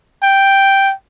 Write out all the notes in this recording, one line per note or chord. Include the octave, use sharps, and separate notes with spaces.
G5